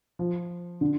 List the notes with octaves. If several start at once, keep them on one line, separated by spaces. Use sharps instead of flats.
F3
D3